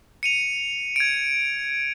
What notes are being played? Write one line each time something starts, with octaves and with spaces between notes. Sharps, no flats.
C#7 D#7 F7
G#6 D7